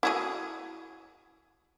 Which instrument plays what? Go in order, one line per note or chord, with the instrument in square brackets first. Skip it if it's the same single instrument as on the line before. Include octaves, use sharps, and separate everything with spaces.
[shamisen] E4 F#4 G#4